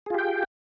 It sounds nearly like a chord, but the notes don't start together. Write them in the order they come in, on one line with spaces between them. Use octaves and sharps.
G#4 F4 G4 G5